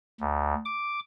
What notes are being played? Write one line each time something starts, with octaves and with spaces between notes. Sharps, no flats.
D2
D6